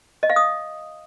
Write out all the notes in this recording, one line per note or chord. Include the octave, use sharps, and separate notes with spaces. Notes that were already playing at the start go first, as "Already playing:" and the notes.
D#5
F5
D#6